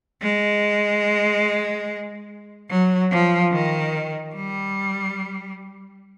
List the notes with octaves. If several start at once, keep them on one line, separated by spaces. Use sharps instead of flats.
G#3
F#3
F3
D#3
G3